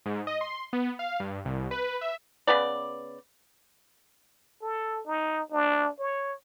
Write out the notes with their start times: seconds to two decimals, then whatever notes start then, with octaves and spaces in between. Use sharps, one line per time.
0.06 G#2
0.27 D#5
0.41 C6
0.73 B3
0.99 F5
1.20 G2
1.45 C2
1.71 B4
2.01 E5
2.47 C#3 B3 B4 D5
4.62 A4
5.07 D#4
5.52 D4
5.99 C#5